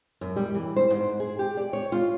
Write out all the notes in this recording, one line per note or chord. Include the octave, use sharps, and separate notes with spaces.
F#2
G3
E3
C5
G#2
G#4
G4
D5
C#5
F4